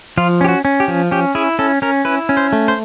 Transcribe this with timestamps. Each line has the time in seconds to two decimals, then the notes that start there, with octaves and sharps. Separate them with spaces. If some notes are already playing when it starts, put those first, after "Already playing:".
0.17 F3 F4
0.41 C#4 G4
0.49 F#4
0.65 C#4
0.80 G4
0.88 F3
1.11 C#4 G4
1.35 E4 G#4
1.59 C#4 A4
1.82 C#4 A#4
2.05 E4 B4
2.29 C#4
2.37 C5
2.53 A3
2.68 C5